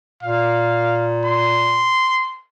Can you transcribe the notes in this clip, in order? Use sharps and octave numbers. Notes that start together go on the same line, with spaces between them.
A#2 F5
C6